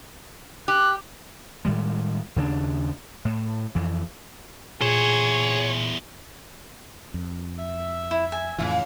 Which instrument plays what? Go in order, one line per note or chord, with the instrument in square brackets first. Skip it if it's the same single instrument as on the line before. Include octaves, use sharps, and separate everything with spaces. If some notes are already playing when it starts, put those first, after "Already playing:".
[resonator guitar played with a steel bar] G4 [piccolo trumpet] F#6
[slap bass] A2 D#3 G3 G#3
D#2 C#3 G#3 D4
A2
F2 E3
[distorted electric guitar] E2 C5 [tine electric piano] A#2 [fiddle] G#4 [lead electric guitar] C#5
[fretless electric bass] F2
[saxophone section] E5
[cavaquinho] E4
G#5
[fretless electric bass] F2 A2 E3 [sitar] C#3 E4 F4